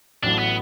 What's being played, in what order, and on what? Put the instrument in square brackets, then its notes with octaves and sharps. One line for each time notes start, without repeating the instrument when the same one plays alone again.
[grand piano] A1 A2 F#3 [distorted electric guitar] D4
[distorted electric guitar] B3